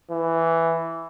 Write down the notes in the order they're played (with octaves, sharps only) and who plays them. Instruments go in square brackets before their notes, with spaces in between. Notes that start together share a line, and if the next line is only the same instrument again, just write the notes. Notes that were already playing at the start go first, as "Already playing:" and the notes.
[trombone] E3